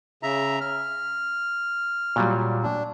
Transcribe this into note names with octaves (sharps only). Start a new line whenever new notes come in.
C#3 E5 A#5
F6
A#2 F#3 G3
D4